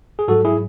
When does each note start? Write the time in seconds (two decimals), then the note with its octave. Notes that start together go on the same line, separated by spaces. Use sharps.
0.19 G#4
0.28 G#2 F#3 F#4 A4
0.45 E4 G#4